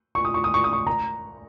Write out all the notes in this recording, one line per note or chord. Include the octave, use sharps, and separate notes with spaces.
C#6
D#6
C#6
D#6
C#6
D#6
C#6
A#5